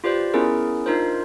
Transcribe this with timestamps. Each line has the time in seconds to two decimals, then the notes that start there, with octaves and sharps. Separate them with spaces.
0.04 F4 G4 B4 C5 D5
0.34 B3 C#4 E4 G#4 A#4
0.86 D4 D#4 F4 A#4 C5